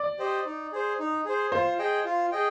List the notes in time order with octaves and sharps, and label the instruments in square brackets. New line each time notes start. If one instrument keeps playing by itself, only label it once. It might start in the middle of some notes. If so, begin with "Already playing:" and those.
Already playing: [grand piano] D5
[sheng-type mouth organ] G4 C5 D#5
D#4
G#4 C5
D#4
G#4 C5
[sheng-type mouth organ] F4 [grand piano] C5
[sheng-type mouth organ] G#4 D#5 G5
F4
G#4 D#5 G5